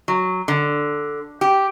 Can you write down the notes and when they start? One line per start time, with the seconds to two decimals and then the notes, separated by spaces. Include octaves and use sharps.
0.08 F#3
0.48 D3
1.41 G4